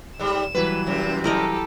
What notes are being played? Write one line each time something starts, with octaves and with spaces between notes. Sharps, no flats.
G#2 G3 E7
E3 F#3 G3 B4
F#2 C3
E4 G4 A4 A#4 D#5